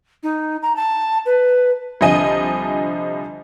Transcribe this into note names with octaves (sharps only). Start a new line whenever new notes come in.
D#4
A#5
A5
B4
C2 D3 F3 D#5 G#5 D#7